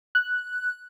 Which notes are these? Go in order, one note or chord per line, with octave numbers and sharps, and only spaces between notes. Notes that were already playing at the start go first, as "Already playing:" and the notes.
F#6